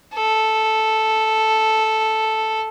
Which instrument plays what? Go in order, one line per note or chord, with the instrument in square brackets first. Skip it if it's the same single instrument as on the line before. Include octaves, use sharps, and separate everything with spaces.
[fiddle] A4